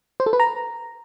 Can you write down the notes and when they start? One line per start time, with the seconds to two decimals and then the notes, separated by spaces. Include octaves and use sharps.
0.20 C5
0.26 A4
0.33 B4
0.40 A#5